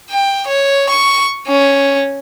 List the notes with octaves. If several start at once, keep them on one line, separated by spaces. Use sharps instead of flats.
G5
C#5
C#6
C#4